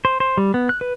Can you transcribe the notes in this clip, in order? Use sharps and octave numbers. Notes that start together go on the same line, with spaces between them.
C5
C5
G3
B3
F#6
B4